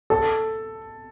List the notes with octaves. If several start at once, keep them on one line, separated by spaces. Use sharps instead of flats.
A4